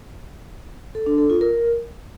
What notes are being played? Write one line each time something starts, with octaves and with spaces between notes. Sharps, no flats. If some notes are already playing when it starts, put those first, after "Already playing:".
A4
D4
A4
F4
A#4